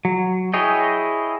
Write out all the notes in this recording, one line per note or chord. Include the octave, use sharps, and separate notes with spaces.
F#3
E4 G#4 C#5 D#5 G5